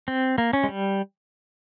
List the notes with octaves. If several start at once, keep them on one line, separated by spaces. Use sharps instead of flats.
C4
A#3
C#4
G#3
G3